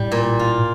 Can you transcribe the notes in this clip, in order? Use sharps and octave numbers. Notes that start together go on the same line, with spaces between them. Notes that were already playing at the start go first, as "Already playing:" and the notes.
Already playing: A2 G3
A#2
F4